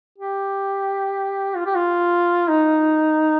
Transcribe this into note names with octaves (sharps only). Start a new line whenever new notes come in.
G4
F4
G4
F4
D#4